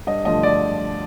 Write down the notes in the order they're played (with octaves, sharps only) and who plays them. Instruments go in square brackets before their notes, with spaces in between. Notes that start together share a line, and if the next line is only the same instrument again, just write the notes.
[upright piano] G2 D#5
D3 F3 A3 D#5
D5